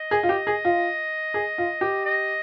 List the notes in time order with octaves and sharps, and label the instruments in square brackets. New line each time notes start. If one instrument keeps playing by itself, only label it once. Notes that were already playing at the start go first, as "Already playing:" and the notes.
Already playing: [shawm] D#5
[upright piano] G#4
F4
G4
G#4
F4
G#4
F4
G4
[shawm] D#5